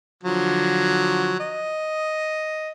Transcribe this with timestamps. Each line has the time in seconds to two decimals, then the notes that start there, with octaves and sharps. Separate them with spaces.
0.23 D3 F3 F#3
1.40 D#5